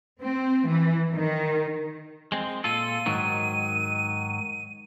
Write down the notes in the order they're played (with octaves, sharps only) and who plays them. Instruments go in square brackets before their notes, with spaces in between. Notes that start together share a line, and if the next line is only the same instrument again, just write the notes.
[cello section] C4
E3
D#3
[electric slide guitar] G#3 C4
[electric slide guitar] A#2 F4 A4 [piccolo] D#7
[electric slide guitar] G#2 D#3 F#3